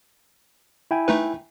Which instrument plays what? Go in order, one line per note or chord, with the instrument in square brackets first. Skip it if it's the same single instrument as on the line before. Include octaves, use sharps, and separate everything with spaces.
[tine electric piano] E4 G5 G#5
[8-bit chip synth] A3 D#4 B4